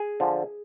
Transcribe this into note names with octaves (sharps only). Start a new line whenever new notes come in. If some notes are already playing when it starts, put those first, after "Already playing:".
Already playing: G#4
D3 F3